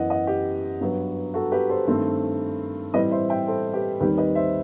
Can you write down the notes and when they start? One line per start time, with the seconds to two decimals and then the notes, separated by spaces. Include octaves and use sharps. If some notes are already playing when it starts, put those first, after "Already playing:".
Already playing: F#2 E3 B3 D#5 F#5
0.10 D#5 F#5
0.27 G4
0.81 G2 F#3 B3
1.34 F#4 A4
1.52 G4 B4
1.69 A4 C5
1.87 G2 D#3 A3 C4 A4 C5
2.93 A2 E3 G3 C4 B4 D#5
3.11 C5 E5
3.29 E5 G5
3.47 A4 C5
3.74 G4 B4
4.00 D#2 D#3 G3 C4 G4 B4
4.18 B4 D#5
4.35 C5 E5